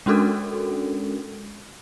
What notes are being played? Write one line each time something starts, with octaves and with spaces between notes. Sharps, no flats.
G#3 C#4 D4 F#4 A4 A#4